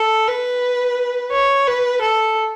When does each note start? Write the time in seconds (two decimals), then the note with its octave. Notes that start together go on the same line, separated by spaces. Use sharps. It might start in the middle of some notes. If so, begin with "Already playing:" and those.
Already playing: A4
0.28 B4
1.32 C#5
1.66 B4
2.01 A4